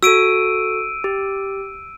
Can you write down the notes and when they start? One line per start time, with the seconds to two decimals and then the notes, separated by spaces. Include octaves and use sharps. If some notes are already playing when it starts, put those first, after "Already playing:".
0.03 F#4 A4 E6 D7 D#7
1.04 G4